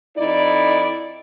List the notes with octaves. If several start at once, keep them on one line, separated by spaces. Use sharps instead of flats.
F2 D#4 E4 D5